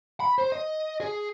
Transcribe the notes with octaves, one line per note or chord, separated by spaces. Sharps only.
B5
C5
D#5
G#4